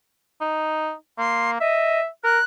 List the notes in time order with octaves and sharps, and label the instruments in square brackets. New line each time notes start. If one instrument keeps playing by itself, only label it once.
[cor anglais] D#4
[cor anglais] A#3 [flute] C6
[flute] D#5 [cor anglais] E5
[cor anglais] A#4 [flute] F#6